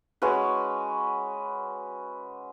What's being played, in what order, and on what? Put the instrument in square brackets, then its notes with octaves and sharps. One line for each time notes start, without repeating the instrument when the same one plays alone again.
[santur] G#3 C#4 F#4 B4